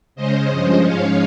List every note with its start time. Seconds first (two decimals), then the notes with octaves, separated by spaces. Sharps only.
0.16 C#3 G#3 C#4 C5 D#5
0.50 G2 F3 G#3 C#4 C5 D#5
0.84 G#2 F3 G#3 C#4 C#5 F5